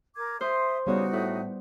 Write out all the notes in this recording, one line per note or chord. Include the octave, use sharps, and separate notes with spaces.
A#4 D6 G#6
C5 E5 C6 D#6
C#3 G3 B3 D#4 F#4 D5
A2